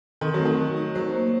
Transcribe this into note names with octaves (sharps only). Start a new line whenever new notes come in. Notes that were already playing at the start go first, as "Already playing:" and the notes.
D#3 C4
F#3
A3
D#3
F#4
D#4
F#3 C5
A#3